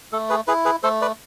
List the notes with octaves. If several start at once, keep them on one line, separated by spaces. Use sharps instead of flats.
A3 A4
G#4 B4
E4 G#4 B4
G#4 B4
A3 A4 C5
B4 D5